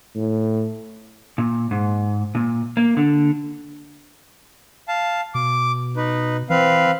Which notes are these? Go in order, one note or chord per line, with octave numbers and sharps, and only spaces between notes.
A2
A#2
G#2
A#2
A#3
D3
F5 A5
B2 D6
D#4 B4
E3 C4 B4 F5